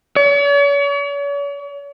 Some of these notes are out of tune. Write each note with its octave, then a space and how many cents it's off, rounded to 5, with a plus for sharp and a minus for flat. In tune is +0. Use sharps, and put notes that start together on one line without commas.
C#5 +45